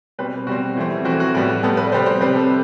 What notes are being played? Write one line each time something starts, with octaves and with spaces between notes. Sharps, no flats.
B2 G3 C4 B4
B2 G3 C4 F#4
E3 A3 C4
E3 A3 C4 F#4
F#4
A2 G3 B3 F#4
A2 G3 B3 A4
B4
D5
C3 G3 C4 C5
C5
C3 G3 C4 B4
A4